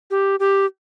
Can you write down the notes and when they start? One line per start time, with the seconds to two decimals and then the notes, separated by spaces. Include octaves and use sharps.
0.11 G4
0.40 G4